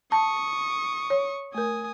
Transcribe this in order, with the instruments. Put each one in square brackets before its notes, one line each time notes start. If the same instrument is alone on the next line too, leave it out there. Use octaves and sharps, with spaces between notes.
[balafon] A5 [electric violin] C#6 D#6
[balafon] C#5
[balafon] A3 A#4 [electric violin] G#5 D#6